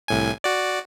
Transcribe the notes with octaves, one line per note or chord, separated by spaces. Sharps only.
C2 A2 G#5
F#4 D5